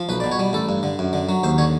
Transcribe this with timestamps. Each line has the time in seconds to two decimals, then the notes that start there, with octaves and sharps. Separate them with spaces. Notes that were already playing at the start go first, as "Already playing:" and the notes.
Already playing: F3
0.09 B1 B4
0.20 B2 D5
0.32 C#5
0.39 G3
0.53 A1 A4
0.69 G2
0.83 D3
0.99 F#2
1.13 D3
1.29 F#3
1.43 D#2 C5
1.58 D3 C#5